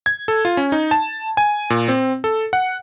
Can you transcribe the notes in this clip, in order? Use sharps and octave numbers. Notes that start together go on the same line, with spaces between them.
G#6
A4
F4
C#4
D#4
A5
G#5
A#2
C4
A4
F#5